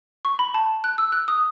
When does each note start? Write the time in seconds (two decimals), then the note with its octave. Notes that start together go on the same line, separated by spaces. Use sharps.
0.25 C#6
0.39 B5
0.54 A5
0.84 F#6
0.98 E6
1.12 F#6
1.28 D#6